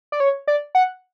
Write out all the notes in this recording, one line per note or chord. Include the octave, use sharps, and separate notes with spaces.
D5
C#5
D5
F#5